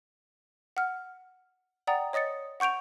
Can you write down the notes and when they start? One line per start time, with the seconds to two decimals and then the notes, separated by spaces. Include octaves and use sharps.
0.77 F#5 F6
1.87 D5 F#5 G5 A#5 D#6 A6
2.13 C#5 D#5 D#6 A6 C#7
2.60 F#5 C#6 G6 D7 F7